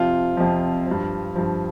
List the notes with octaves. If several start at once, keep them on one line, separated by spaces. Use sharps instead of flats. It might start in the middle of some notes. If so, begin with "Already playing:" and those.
Already playing: F2 C3 F3 F4
F2 C3 F3
G2 F3
G2 F3